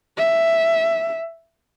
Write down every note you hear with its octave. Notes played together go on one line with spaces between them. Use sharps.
E5